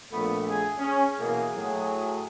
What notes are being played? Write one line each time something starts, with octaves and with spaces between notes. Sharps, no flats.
A#1 A#2 A3 B3
G#4
C#4 G#4
B2 E3 A#3
A2 F#3